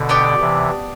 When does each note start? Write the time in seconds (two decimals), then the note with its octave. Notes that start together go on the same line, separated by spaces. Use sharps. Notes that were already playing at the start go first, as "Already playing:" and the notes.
Already playing: B2 D3
0.09 B3 D4 G4 D5
0.41 C3 E3